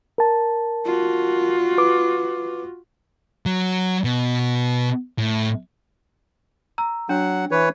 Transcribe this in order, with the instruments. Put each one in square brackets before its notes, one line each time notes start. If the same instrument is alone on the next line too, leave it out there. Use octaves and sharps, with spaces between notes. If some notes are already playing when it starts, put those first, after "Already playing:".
[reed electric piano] A#4 A5
[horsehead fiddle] F4 F#4
[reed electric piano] B4 D6
[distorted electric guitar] F#3
B2
A2
[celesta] A#5 E6
[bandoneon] F#3 F#5 [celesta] D4
[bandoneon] E3 B4 C#5